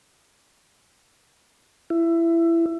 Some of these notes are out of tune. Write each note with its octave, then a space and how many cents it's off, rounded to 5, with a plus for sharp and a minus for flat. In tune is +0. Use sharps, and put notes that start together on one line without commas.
E4 +20